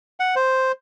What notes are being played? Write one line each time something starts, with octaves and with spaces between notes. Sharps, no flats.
F#5
C5